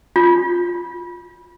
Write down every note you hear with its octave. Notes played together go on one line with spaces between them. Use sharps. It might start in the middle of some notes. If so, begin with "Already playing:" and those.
F4